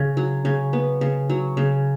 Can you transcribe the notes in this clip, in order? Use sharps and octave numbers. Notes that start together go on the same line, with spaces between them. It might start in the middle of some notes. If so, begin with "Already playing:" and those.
Already playing: C#3
F#3
C#3
B3
C#3
F#3
C#3